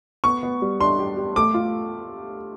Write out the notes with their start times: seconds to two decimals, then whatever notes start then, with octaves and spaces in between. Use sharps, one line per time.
0.24 B3 C#6
0.43 B3
0.62 G3
0.81 D4 C6
0.99 G4
1.17 G4
1.36 A3 D6
1.54 F4